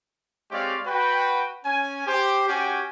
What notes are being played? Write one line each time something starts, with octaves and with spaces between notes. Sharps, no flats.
G#3 C4 G4 C#5 D5 F5
F#4 B4 G5
C#4 G#5
G4 C5
C#4 F#4 G4 G5 G#5